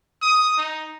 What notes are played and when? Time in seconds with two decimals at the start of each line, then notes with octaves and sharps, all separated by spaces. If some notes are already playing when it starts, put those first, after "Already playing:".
0.22 D#6
0.58 D#4